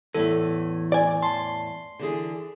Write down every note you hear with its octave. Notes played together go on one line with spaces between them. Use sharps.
E2 A2 E3 A4
D5 G#5
A5 C6
D3 E3 G#4